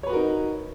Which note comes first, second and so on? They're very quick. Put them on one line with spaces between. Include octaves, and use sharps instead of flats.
C#5 B4 F#4 A#4 D#4